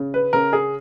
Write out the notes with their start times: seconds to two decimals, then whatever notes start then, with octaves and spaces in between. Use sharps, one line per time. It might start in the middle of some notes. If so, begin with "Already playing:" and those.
Already playing: C#3
0.14 B4
0.33 C#3 A#4
0.53 G#4